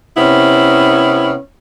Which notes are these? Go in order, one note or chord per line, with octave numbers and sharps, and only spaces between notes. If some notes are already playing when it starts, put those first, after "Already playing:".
C3 B3 C#4 E4